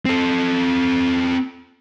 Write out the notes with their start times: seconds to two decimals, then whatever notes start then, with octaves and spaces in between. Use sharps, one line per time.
0.05 C4 A4